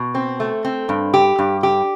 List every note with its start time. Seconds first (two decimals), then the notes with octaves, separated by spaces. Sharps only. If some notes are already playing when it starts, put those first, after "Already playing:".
Already playing: B2
0.15 C4
0.40 A3
0.65 C4
0.89 G2
1.14 G4
1.39 G2
1.63 G4